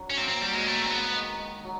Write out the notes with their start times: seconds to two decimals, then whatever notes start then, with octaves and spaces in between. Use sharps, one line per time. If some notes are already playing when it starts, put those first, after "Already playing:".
Already playing: F#3 D4
0.10 C#4
0.17 A#3 C4
0.29 C4
0.42 F#3 G3
0.53 G#3
0.66 D#3 A3
0.82 C4
0.90 G#2 B3
1.15 D#3
1.39 D#3
1.64 F#3